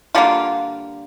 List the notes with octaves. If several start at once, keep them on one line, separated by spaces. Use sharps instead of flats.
D3 G3 A#3 F4